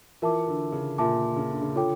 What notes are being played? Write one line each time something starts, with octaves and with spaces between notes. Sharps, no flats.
E3 F4 A#4 E5 A5 D6
D3
C#3
A#2 F4 A#4 E5 A5 D6
C#3
D3
C#3
D3 F4 A4 C#5 G5 D6